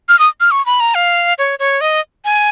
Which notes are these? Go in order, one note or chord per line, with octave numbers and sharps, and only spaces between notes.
F6
D#6
F6
C#6
B5
A#5
F5
C#5
C#5
D#5
G#5